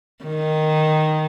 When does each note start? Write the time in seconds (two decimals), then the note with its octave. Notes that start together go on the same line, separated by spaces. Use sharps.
0.24 D#3